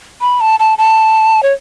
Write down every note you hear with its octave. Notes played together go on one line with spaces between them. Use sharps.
B5
A5
A5
A5
C#5